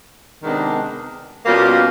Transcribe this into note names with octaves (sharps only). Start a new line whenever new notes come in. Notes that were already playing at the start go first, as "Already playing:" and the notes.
C3 D#3 G#3 B3 D4
B2 G3 A#3 C#4 F4